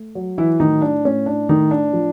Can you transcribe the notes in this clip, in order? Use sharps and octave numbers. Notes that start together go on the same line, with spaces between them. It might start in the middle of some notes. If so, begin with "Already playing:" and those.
Already playing: A3
F#3
E3 E4
A2 D#3 D#4
D4
A2 C#4
D4
D#3 A3 D#4
D4
F3